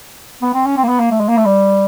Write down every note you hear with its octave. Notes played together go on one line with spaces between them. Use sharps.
B3
C4
C#4
C4
A#3
B3
A#3
A3
G#3
A#3
A3
G3